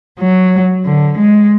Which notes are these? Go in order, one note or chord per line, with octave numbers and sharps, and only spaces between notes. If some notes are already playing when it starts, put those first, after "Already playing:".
F#3
D3
G#3